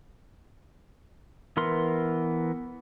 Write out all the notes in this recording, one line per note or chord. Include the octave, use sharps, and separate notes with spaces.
E3 B3 A#4 C6